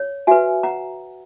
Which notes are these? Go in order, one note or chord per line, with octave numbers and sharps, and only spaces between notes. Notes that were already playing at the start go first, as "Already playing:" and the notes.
Already playing: C#5
F#4 B4 E5 G#5
F#5 A#5